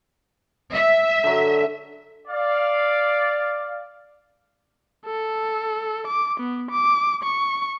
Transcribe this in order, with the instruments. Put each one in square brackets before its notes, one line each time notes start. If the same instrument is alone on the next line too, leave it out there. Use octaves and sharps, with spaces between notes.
[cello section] E5
[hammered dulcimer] D3 F#3
[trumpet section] D5 F5
[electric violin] A4
D6
B3
D6
C#6